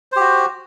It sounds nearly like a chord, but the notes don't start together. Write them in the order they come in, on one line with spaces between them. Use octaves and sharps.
C5 G4 F#4